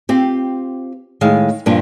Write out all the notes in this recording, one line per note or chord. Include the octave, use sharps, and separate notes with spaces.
C4 F4 G4
A2 D#3 G#3 F5
G2 A#2 F3 D4